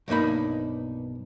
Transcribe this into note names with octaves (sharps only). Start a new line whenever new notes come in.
B1 G2 A#3 D#4 B5